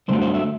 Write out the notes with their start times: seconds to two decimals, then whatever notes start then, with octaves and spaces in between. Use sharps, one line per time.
0.08 G2 D3 F#3 A3 C5
0.21 C5
0.34 E5